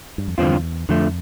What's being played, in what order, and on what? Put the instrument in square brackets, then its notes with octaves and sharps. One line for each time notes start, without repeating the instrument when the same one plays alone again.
[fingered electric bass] G2
F2
[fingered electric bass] E2 [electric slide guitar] G2 D3 F3 C4 F4
[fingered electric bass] F2 [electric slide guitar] D3 F3 A3